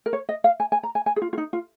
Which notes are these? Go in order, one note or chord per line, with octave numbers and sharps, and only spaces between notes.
A#4
C#5
D#5
F5
G#5
G#5
A#5
G#5
G#5
G#4
F4
F4
D#4
F4